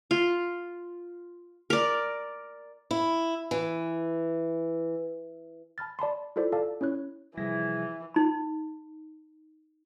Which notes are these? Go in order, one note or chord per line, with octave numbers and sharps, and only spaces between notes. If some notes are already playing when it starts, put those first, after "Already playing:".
F4
A#4 D5
E4
E3
A5 B5 F6 A6
D5 A5 B5 C6
E4 F4 A4 C5 D5
A4 D5 F5 A5
C#4 E4 C#5 F#6
C3 E3 F3 G3 E4 G#4 A#6
D#4 B5